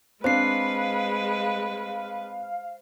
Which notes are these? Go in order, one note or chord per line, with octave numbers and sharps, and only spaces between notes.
G#3 C4 D4 B4 C5 F5 C7